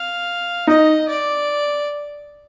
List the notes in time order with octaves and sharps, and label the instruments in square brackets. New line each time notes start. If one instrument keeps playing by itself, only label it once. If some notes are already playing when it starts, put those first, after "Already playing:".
Already playing: [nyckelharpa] F5
[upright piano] D#4 [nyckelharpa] D#5
[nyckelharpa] D5